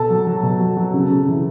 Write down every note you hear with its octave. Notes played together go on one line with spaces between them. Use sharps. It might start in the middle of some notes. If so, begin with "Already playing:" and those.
Already playing: B2 A4 A5
F#3
F#3
B2
F#3
F#3
C#3
C#3
E3